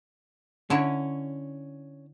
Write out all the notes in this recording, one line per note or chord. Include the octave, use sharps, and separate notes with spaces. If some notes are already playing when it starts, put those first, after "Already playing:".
D3 C#4 E4 C#5